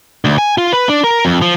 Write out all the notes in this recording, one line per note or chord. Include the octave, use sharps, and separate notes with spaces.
D2
G#5
F4
B4
D4
A#4
F2
F3